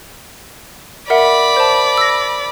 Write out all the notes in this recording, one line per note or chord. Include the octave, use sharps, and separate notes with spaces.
A#4 D5 E5 F#5 B5
C5 A5
E6 A#6